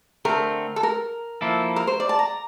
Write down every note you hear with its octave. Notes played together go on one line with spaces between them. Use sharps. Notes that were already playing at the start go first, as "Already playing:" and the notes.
D3 A3 C4 A#4
A4
A#4
F3 A#3 E4 A4
A#4
C5
D5
A5
A#5